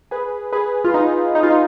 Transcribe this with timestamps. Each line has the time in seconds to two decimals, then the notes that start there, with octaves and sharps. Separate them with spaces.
0.11 G#4 B4
0.53 G#4 B4
0.84 F4
0.94 D#4
1.35 D#4
1.43 F4
1.50 D#4